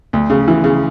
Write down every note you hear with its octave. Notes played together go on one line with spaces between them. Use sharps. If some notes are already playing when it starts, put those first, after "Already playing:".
D2
C#3
E3
C#3